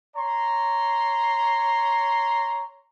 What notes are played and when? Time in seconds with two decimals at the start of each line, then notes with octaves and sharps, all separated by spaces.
0.15 C#5 A#5 C6